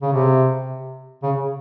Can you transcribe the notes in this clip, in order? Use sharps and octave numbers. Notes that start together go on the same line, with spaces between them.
C#3
C3
C#3